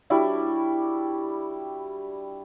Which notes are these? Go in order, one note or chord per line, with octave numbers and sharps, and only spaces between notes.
G3 D4 E4 F#4